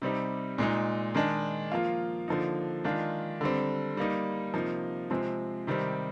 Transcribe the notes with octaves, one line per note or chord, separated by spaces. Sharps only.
C3 G3 C4 D#4
A#2 G#3 D#4
D#3 G#3 D4
F3 A#3 F4
D3 F3 A#3 D#4
D#3 G#3 D4 F4
D3 G3 C4
G3 A#3 D#4
C3 F3 A#3 D#4
C3 F3 G#3 C4
C3 D#3 G3 C4